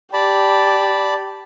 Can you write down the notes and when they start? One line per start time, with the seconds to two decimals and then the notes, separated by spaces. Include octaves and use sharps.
0.13 G4 D5 A5 B5